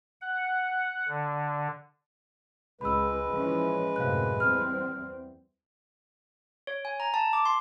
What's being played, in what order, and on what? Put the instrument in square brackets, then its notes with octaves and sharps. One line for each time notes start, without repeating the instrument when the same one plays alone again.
[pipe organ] F#5
D3
[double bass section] C#2 [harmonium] G#3 B4 [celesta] B5 E6
[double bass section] E3 F3 C#4
[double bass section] F#2 A2 C3 [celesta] F5 F#6
[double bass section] E2 G3 C4 [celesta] F6
[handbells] C#5
G#5
A#5
A5
D6
C6